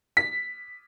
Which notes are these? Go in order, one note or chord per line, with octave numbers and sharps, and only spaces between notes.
B6